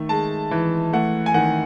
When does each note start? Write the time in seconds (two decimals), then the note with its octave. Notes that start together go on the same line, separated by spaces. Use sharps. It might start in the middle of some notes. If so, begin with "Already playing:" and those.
Already playing: D#3 A3
0.09 G#3 A5
0.51 E3
0.93 A3 F#5
1.26 G#5
1.34 D#3 F#5